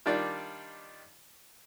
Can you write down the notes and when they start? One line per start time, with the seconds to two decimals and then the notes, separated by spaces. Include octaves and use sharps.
0.06 D#3 G3 D4 F4 D5